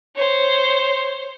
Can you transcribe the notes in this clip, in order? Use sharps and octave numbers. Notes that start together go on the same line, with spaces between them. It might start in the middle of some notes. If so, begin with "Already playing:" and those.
C5 C#5